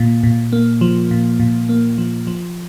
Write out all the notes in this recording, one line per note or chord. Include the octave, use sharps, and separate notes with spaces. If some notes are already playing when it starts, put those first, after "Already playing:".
Already playing: A#2
A#2
A#3
F3
A#2
A#2
A#3
F3
F3